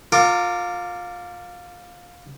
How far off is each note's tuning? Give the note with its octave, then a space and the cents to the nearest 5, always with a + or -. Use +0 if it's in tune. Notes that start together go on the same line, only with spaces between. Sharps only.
F4 +20 A#4 -25 D6 +0